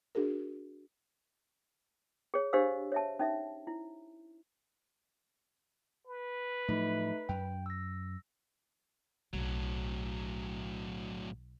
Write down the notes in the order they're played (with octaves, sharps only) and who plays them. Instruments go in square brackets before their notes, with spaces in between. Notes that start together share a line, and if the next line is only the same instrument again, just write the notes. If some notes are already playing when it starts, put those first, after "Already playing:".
[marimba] D4 F#4 G#4 A#4
[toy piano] G#4 C#5
D4 G4 C5 D#5 F5 E6
C#5 E5 A5
C#4 D#4 E5
E4
[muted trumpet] B4
[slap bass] A2 F3 F#3 [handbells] A3 D#4
[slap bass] F#2 [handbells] G5
[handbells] E6 A#6
[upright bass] B1 [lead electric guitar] A2 F#3